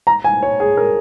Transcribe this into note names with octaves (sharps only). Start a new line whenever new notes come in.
A#5
G#5
C#5
G#4
A#4